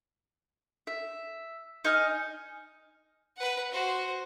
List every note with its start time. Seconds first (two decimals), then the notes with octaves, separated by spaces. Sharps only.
0.87 E5
1.85 D#4 D#5 G#5 F6
3.37 B4 F#5
3.72 F#4 C5